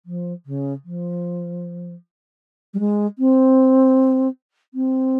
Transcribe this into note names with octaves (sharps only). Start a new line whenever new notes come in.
F3
C#3
F3
G3
G#3
C4
C4